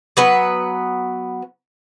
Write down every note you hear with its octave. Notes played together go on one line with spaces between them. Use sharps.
F#3 B3 B4